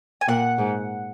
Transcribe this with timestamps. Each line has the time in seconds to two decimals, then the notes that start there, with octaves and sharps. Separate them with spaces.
0.21 G#5
0.28 A#2 F#5
0.58 G#2